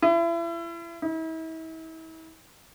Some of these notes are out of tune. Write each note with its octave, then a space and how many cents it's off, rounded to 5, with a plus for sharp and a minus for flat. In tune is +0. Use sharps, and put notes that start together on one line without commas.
E4 +35
E4 -40